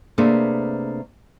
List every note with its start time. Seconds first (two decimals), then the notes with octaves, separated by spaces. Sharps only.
0.18 C3 A3 A#3 D4 G#4 B4